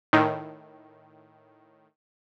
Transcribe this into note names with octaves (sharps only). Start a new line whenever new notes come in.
A2 D#3